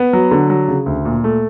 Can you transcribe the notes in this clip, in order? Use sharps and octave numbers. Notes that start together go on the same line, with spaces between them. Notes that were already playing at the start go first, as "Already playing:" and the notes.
Already playing: B3
F#3
D3
F#3
C#3
D2
A#2
A3